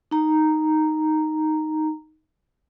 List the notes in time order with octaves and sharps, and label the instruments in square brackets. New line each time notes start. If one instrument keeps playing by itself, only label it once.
[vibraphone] D#4 A#5